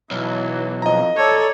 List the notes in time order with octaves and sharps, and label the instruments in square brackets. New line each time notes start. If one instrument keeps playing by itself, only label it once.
[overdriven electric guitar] B1 [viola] E3 F#3
[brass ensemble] F2 [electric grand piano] D#5 A#5
[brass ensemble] A4 [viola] C#5 D5